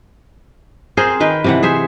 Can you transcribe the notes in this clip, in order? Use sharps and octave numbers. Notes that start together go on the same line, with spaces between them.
C4 G#4 A#4 C5
D#3 B4 G5
C3 E3 F#5
G#4 C5 E5